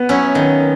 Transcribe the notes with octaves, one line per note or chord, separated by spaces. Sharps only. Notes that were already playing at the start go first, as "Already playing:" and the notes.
Already playing: B3
F#3 C#4 E4
D#3